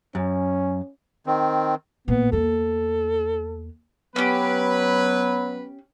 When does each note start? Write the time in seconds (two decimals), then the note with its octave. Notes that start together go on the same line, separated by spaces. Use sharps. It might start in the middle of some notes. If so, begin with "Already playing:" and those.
0.15 F#2 C#4
1.26 D#3 C4
2.08 A1 A#2 B3
2.32 E2 A#3 A4
4.16 F#3 B3 C#4 G4 B4